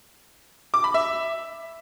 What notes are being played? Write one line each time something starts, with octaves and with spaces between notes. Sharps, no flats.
D6
B5
E5